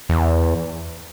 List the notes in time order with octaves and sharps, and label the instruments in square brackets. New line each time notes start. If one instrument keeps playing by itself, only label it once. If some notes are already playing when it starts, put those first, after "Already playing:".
[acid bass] E2